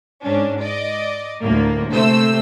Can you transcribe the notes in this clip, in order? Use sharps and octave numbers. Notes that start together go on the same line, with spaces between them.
G#2 C#4 D4
D5 D#5
D2 A2 D3 A#3
C3 A3 C5 E6